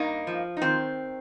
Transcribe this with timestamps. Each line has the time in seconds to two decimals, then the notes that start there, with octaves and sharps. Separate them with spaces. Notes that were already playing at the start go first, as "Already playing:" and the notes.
Already playing: G2 A#3 D#4
0.27 F3
0.57 D#4
0.62 D#3 C4